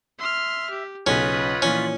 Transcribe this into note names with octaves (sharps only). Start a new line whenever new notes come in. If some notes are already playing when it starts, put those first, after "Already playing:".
E5 C6 F6
G4
B1 C#3 C#4 F4 B4 C#5 D#5 B5
A#2 E3 F3 C#4